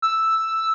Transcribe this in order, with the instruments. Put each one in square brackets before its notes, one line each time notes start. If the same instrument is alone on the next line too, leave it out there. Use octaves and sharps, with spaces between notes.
[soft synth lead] E6